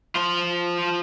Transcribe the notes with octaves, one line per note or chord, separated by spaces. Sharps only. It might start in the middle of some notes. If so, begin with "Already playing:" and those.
F4 C5